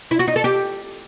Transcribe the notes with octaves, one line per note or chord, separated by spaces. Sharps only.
E4
F#4
D#4
A4
G4